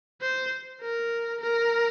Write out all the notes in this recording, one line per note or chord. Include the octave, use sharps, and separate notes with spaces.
C5
A#4
A#4